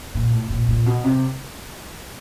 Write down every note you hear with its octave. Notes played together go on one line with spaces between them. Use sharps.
A#2
A2
A#2
A#2
B2
C3